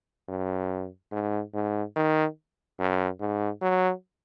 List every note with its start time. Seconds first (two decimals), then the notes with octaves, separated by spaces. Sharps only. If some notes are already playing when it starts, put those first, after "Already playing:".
0.28 F#2
1.12 G#2
1.54 G#2
1.96 D#3
2.79 F#2
3.20 G#2
3.62 F#3